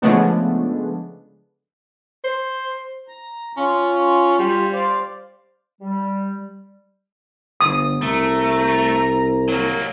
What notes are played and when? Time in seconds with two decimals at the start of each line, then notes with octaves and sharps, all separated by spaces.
0.02 C#3 F3 G#3 A3 B3 D4
2.24 C5
3.08 A#5
3.57 C#4 F4
4.39 G3
4.73 C5 D5 F5
5.81 G3
7.61 G1 D#6
8.02 C2 A3 A#5
9.48 F#3 A#3